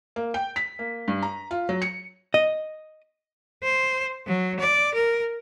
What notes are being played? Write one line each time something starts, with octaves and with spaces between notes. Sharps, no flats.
A#3
G5
B6
A#3
G2
A#5
F4
F#3
C#7
D#5
C5
F#3
D5
A#4